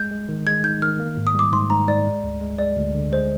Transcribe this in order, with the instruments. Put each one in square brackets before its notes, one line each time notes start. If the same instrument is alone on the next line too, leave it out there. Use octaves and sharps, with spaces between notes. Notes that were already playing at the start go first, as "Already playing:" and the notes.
Already playing: [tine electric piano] G#3 [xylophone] G6
[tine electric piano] G#3
D#3
[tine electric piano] G#3 [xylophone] G#6
[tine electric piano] D#4 [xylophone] G6
[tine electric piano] D#3 [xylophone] F6
[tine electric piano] A#3
G#2
[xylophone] D#6
[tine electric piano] G3 [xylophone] D6
[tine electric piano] G#2 [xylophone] C6
[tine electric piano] G#2 [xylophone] A#5
[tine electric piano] G#2 [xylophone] D5
[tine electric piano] G#3
D2
G#3
[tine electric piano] G#3 [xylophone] D5
[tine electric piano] D2
D3
[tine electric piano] G#3 [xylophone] C5